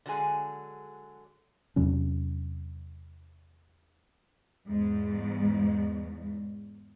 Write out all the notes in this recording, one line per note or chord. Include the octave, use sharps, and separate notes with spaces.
D3 F#3 G#3 G#4 G#5
E2 C3 F#3 C#4
E2 G#2